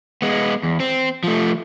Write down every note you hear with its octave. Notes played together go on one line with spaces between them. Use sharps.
G#3 B3
E2
C4
F3 A3